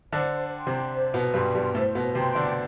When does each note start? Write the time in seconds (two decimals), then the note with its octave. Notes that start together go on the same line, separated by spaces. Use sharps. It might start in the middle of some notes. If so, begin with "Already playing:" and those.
0.12 D3 D4 C5
0.53 G5 C6
0.67 C3 C4
0.94 C5
1.14 B2 B3
1.34 G2 G3 G5 C6
1.55 G2 G3
1.75 A2 A3 C5
1.95 B2 B3
2.15 C3 C4 G5 C6
2.35 D3 D4